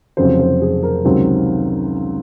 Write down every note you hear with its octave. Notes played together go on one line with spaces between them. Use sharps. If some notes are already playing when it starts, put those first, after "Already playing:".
F1 F2 C#3 F#3 C4 C5
C5
G#4
A#4
C#2 C3 D#3 F#3 C4